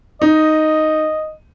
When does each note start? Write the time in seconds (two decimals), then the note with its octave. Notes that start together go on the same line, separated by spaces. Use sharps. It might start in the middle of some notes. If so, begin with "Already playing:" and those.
0.21 D#4 D#5